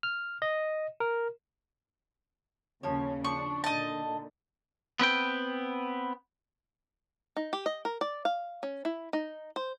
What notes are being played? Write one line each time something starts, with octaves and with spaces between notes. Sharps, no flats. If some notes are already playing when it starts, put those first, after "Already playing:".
F6
D#5
A#4
D#2 C#3 F3 C#4 C#5
F3 D4 C#6
A#2 D3 D#4 D#5 A5
B3 C4 B4 G5
D#4
G4
D#5
A#4
D5
F5
C#4
E4
D#4
C5